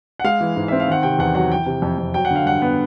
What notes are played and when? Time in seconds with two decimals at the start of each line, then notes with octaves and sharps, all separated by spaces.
0.20 F#5
0.24 G#3 F5
0.41 E3
0.56 G#2
0.68 C4 E5
0.80 F5
0.88 D#3 F#5
1.03 C3 G5
1.19 E2 F#5
1.35 F#3 F#5
1.51 E3 G5
1.66 C3
1.82 F2
1.98 F2
2.14 F#3 G5
2.25 F#5
2.31 D3
2.36 F5
2.45 G2 F#5
2.62 B3